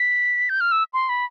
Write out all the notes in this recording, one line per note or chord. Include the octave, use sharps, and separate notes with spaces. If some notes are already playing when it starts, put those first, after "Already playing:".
Already playing: B6
G6
F6
E6
C6
B5